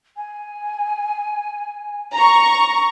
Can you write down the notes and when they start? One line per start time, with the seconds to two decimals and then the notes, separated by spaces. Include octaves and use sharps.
0.17 G#5
2.15 A#5 C#6